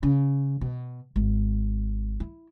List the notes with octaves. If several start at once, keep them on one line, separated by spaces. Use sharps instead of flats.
C#3
B2
G#1
E4